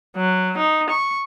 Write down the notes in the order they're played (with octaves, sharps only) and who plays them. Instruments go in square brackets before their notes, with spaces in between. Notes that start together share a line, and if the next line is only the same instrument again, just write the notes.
[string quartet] F#3
D#4
C#6